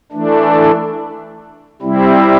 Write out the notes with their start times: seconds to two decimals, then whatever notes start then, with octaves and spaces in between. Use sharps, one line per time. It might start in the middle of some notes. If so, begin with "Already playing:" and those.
0.12 E3 A3 D4
1.82 C3 G3 C4 E4